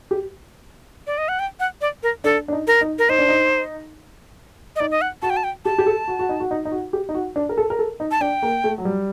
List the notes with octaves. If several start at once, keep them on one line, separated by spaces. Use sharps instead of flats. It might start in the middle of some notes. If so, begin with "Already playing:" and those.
G4
D5
D#5
F#5
G5
F#5
D5
A#4
D4 A4
D4
D#4
A#4
D#4
A#4
D#4 C5
D4
D#4
D#5
D#4 D5
D#5
F#5
F#4 A5
G5
A5
G5
G4 A5
G4
A4
F#4
F#4
D#4
F#4
D#4
D#4
F#4
G4
D#4
F#4
D4
A#4
A4
A#4
A4
D#4
A5
D4 G5
A#3
A3
F#3
G3